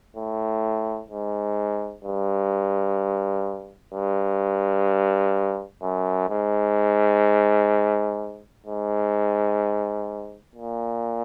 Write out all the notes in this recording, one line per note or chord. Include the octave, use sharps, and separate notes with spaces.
A2
G#2
G2
G2
F#2
G#2
G#2
A#2